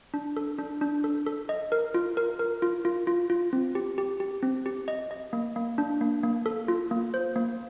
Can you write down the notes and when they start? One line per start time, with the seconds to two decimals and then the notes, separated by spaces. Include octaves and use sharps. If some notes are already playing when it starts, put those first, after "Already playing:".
0.14 D4
0.37 A4
0.59 D4
0.81 D4
1.04 A4
1.27 A4
1.49 D#5
1.72 A#4
1.94 F4
2.17 A#4
2.39 A#4
2.62 F4
2.85 F4
3.07 F4
3.30 F4
3.53 C4
3.75 G4
3.98 G4
4.20 G4
4.43 C4
4.66 G4
4.88 D#5
5.11 D#5
5.33 A#3
5.56 A#3
5.78 D4
6.01 A#3
6.23 A#3
6.46 A4
6.68 F4
6.91 A#3
7.14 C5
7.36 A#3